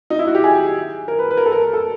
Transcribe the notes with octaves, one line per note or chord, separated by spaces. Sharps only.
D#4
E4
F#4
G4
G#4
A#4
B4
B4
A#4
A4
A#4
A4